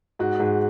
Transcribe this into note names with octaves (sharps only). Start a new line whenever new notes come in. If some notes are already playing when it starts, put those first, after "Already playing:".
G#2 F#4
G#2 G#4